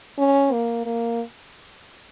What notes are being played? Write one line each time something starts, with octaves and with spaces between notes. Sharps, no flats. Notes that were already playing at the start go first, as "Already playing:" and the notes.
C#4
A#3
A#3